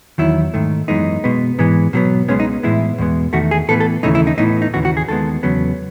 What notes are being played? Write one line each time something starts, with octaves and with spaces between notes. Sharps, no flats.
E2 D#3 F#3 E4
G#2 D#3 A3
F#2 E3 G#3 B3 D#4
B2 G#3 B3
G#2 E3 G#3 B3
B2 F#3 B3
C#2 C#3 G#3 B3 C#4
D#4
A2 E3 G#3 B3 E4
E2 B2 G#3 B3
E2 D#3 A3 F#4
G#4
A2 E3 B3 A4
A4
D#2 C#3 E3 A3 D#4
E4
D#4
A2 E3 B3 D#4
D#4
D#2 C#3 E3 F#4
F#4
G#4
D#2 D#3 G#3 B3 A4
E2 C#3 F#3 B3